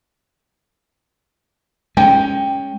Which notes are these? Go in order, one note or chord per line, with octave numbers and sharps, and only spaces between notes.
G#3 C#4 G5